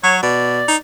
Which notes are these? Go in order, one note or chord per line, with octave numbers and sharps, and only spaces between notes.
F#3 C#5
B2 D5
D#4